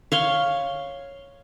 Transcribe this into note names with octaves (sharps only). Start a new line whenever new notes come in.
C#5 F5 C6